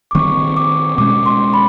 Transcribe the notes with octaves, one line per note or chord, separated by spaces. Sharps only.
D6
D#3 G3 C4 C#6
D6
B2 G#3 C#4 D6
C6
B5